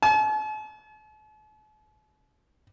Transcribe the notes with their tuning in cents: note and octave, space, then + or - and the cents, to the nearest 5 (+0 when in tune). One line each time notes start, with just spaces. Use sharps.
A5 -45